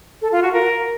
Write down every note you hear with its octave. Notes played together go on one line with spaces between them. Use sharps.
A4
F4
F#4
A#4